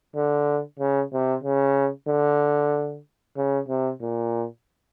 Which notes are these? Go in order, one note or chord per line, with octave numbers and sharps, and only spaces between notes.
D3
C#3
C3
C#3
D3
C#3
C3
A#2